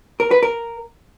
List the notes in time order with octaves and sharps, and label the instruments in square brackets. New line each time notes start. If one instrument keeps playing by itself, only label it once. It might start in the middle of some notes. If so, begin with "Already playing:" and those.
[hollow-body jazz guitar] A#4
B4
A#4